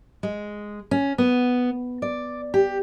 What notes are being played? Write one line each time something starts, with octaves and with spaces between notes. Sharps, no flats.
G#3
C#4
B3
D5
G4